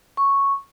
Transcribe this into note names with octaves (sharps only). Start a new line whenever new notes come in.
C#6